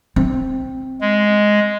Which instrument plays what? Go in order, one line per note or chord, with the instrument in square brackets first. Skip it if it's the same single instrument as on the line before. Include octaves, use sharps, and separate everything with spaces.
[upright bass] C4
[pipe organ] G#3